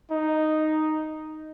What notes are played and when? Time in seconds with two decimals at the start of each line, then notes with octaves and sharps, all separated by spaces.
0.11 D#4